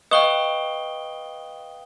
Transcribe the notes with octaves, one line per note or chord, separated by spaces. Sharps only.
B4 D#5 F5 G5 C#6 D#6 G7